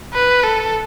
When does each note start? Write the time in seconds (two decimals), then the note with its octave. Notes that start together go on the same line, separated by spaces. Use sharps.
0.14 B4
0.43 A4